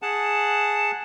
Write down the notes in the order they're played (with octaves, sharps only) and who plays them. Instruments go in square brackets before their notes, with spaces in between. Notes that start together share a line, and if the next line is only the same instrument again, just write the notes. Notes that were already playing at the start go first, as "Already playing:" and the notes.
[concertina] G#4 F#5 A5